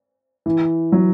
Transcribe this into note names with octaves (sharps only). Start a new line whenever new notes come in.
E3
F#3